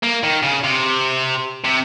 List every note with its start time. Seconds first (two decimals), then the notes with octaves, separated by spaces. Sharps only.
0.03 A#3
0.23 D#3
0.43 C#3
0.64 C3
1.64 C3